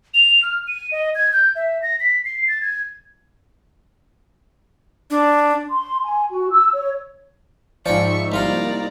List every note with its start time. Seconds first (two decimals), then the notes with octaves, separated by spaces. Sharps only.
0.14 F7
0.43 F6
0.68 D#7
0.92 D#5
1.15 G#6
1.33 G6
1.55 E5
1.82 A#6
2.00 B6
2.25 C7
2.48 A6
2.61 G#6
5.10 D4
5.70 C6
6.03 G#5
6.29 F#4
6.50 E6
6.73 C#5
7.86 G#2 F3 D#4 D5 E5 G5 C#6
8.32 C2 A#3 D#4 F4 D5 F5 A#5